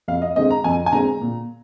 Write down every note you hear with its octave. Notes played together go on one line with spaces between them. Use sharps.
F2 F5
D#5
D3 G#3 C4 D#5
A#5
F2 G#5
G#5
D3 G#3 C4 A#5
A#2